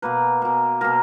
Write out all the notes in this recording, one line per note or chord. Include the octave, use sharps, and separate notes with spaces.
B2 A#3 B4
B2 A#3
B2 A#3 A#4